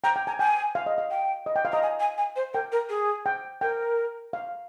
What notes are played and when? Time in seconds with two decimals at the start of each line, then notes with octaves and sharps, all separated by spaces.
0.04 G5 A#5
0.16 G5
0.27 G#5 A#5
0.39 G5 G#5
0.75 F5
0.86 D#5
0.98 F5
1.11 G5
1.46 D#5
1.56 G5
1.65 F5
1.72 D#5 A#5
1.83 G#5
2.00 G#5
2.18 G#5
2.36 C5
2.54 A#4 G5
2.72 A#4
2.89 G#4
3.26 G5
3.61 A#4 G5
4.33 F5